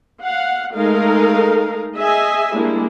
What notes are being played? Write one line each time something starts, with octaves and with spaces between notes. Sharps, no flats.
F5 F#5
G#3 A3 D#4 A4 A#4 F5
G#4 D#5 E5 G#5
G3 G#3 A#3 D4 E4